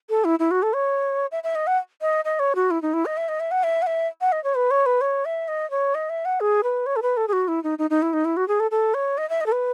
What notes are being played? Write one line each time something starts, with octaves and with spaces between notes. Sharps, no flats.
A4
E4
E4
F#4
A4
C#5
E5
E5
D#5
F#5
D#5
D#5
C#5
F#4
E4
D#4
E4
D#5
E5
D#5
E5
F#5
E5
F#5
E5
F#5
D#5
C#5
B4
C#5
B4
C#5
E5
D#5
C#5
D#5
E5
F#5
G#4
B4
C#5
A4
B4
A4
G#4
F#4
E4
D#4
D#4
D#4
E4
D#4
E4
F#4
G#4
A4
A4
C#5
D#5
E5
D#5
A4
B4